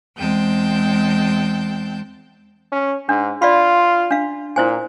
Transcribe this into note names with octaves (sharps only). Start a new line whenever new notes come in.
E2 G#3 C4 G5 A5 G6
C#4
G#2 D4
F4 D5 F5 B5
D4 F5
A#2 E4 C5 G#5